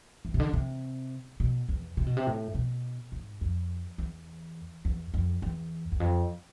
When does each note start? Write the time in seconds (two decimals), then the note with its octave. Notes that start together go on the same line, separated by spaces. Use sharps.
0.25 E3
0.34 C3
0.40 D3
0.53 C3
1.40 B2
1.69 E2
1.97 C3
2.06 B2
2.17 C3
2.27 A2
2.55 B2
3.12 G#2
3.41 F2
3.98 E2
4.85 E2
5.14 F2
5.42 E2
5.92 E2
6.00 F2